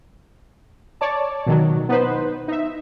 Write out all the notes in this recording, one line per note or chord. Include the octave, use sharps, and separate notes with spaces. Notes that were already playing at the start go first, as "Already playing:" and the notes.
C#5 D5 A5
B2 D#3 F#3
B3 D#4 B4 C5
D#4 E5